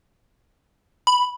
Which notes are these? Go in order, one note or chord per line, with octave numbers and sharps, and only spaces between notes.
B5